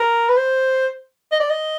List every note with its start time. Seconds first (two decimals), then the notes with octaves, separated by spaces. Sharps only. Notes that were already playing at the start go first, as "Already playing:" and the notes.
Already playing: A#4
0.28 B4
0.37 C5
1.32 D#5
1.40 D5
1.50 D#5